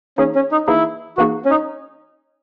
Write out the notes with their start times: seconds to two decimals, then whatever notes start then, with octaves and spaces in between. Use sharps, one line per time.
0.18 E3 A#3 C#4 D#4 G#4
0.35 C#4
0.52 D#4
0.68 E3 A#3 D#4 E4 G#4
1.17 E3 A#3 D#4 F#4 G#4
1.45 C#4
1.51 D#4